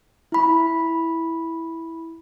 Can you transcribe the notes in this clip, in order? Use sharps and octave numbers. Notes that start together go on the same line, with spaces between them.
E4 B5